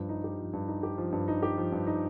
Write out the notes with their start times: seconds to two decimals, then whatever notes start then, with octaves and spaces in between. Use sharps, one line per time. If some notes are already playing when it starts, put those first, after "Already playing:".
Already playing: G2 F3
0.09 D#4
0.24 G4
0.39 F3
0.53 G2
0.68 D#4
0.83 G4
0.98 F3
1.13 G2
1.28 D#4
1.42 G4
1.57 F3
1.72 G2
1.87 D#4